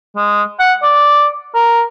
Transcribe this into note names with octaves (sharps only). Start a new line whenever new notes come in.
G#3
F#5
D5
A#4